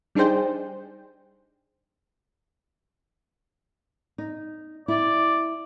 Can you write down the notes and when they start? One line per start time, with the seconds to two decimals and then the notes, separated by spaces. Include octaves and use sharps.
0.15 G3 D4 D#4 G#4 C5 G5
4.18 D#4
4.88 E4 D5